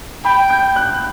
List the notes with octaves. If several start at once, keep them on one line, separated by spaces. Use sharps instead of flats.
G5 B5
G6
F#6